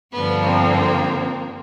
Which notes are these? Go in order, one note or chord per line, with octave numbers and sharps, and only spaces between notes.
G2 D3 F3 B3
A#3 C4